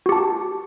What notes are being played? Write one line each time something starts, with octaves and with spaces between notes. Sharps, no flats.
F#4 G4 A5